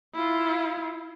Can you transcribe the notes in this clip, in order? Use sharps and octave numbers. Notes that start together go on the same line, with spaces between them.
E4 F4